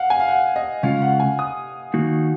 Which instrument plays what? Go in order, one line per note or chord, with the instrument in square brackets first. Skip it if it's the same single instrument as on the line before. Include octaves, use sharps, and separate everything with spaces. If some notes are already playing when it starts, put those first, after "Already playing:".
Already playing: [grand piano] F5 F#5
G#5
F5
F#5
D#5
[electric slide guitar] C#3 G#3 C#4 F4 [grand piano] F5
[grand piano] F#5
G#5
D#6
[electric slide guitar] D#3 A#3 D#4 F#4